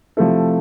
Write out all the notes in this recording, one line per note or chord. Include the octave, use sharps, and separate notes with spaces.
C3 F3 A3 E4 A4